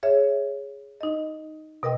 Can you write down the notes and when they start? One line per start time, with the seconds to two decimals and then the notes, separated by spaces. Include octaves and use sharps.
0.03 G#4 C#5 E5
1.01 D#4 D#5
1.83 B2 A#4 D#5 G5